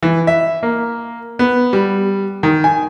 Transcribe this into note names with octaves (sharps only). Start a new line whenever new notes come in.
E3
E5
A#3
B3
G3
D#3
G#5